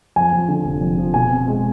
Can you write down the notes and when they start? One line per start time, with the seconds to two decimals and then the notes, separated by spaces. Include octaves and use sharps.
0.16 F2 G#5
0.33 F3
0.49 D3
0.65 F1
0.81 F2
0.98 F3
1.14 B2 G#5
1.31 C4
1.48 G#3